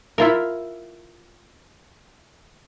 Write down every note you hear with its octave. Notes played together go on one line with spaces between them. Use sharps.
E4 F4 A#4